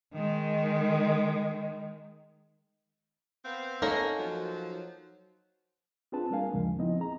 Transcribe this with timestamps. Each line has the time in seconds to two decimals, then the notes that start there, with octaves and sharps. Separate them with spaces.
0.13 D#3 G#3
3.44 B3 C4 F5
3.82 A#3 C#4 D#4 A4 A#4
4.17 F3 F#3
6.12 C4 D4 F4 G#4 B4 A5
6.31 G3 A#3 D4 A#4 F5 G#5
6.52 D#2 G#2 C#3 F3 G#3 A#3
6.79 F3 B3 C4 D#4 E4 D#5
7.00 G#4 A#5